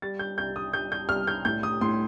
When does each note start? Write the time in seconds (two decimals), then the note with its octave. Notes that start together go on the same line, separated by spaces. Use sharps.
0.02 G3 A6
0.19 G6
0.38 C2 G6
0.56 D#6
0.73 G3 G6
0.92 G6
1.09 C2 F6
1.27 G6
1.45 A2 G6
1.63 D#6
1.81 A2 C6